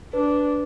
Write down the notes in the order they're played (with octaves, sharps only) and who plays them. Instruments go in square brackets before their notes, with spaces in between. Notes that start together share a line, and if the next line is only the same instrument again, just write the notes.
[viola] D4 [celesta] B4